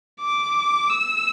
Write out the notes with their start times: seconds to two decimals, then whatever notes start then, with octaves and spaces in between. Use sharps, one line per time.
0.20 D6
0.90 E6